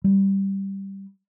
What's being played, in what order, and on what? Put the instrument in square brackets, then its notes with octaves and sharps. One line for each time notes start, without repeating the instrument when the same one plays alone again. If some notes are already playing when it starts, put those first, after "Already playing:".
[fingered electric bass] G3